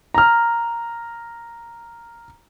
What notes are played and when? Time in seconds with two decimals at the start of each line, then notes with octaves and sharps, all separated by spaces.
0.14 A#5 F6